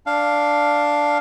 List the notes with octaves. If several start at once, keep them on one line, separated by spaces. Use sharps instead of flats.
D4 F5